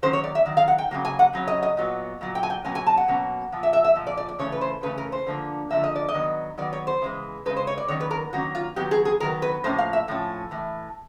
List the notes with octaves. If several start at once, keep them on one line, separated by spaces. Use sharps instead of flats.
D#3 F#3 A#3 C#4 C5
C#5
D5
E5
D#3 F#3
F5
F#5
G5
C#3 F#3 A#3
G#5
F#5
C#3 F#3 C#4
D#5
D#5
A#2 F#3 B3
A#2 F#3
G5
G#5
G5
B2 F#3 A#3 C#4 G#5
G#5
A5
F#5
B2 F#3 A#3 C#4
A#2 F3
E5
E5
E5
A#2 F3
D5
D5
D5
C#3 E3 A3 C#4 C#5
B4
C5
C#3 E3 A3 C#4 B4
A#4
C5
D3 F3 A#3
D3 F3 A#3 E5
D#5
D5
D#5
D#3 F#3 B3
D#3 F#3 B3 D5
C#5
C5
C#3 E3 G#3
C#3 E3 G#3 B4
C5
C#5
D5
D#3 F#3 A#3 C#4 C#5
B4
A#4
D#3 F#3 A#3 C#4 F#4
F4
D#3 F#3 B3 G4
G#4
G#4
D#3 F#3 B3 A#4
B4
A2 F3 A#3 C#4 C5
F5
E5
A2 F3 C#4
A2 E3